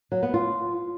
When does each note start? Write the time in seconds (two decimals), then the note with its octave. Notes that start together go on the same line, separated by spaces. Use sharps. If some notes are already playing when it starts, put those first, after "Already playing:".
0.12 F#3
0.23 B3
0.34 F4